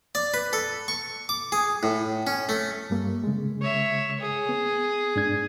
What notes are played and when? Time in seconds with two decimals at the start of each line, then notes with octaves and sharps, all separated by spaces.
0.15 D5
0.34 B4
0.53 A4
0.88 C#6
1.29 D6
1.52 G#4
1.83 A2
2.27 C#4
2.49 A3
2.90 G2 G3 A#3
3.24 C#3 G#3
3.61 C#5 E5
4.20 G#4
4.49 B3
5.16 G#2 D4 G#6